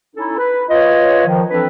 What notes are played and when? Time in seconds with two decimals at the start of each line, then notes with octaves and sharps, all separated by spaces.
0.16 C#4 D#4 E4 A4
0.38 B4
0.69 F4 B4 C#5 D#5
1.26 D#3 F3
1.50 E3 F3 C4 D4 A4 B4